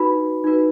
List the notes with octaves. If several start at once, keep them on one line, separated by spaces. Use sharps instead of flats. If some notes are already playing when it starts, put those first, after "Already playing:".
Already playing: D#4 F#4 B4 B5
D#4 F#4 B4